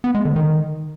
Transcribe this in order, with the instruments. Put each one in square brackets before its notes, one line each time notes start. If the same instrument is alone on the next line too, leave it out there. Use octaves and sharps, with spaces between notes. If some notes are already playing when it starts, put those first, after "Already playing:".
[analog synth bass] B3
G#3
D3
D#3